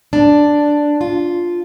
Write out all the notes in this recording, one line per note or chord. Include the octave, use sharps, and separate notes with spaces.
D4
F4